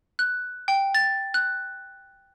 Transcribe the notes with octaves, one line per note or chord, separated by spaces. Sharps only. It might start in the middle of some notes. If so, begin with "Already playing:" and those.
F#6
G5
A6
F#6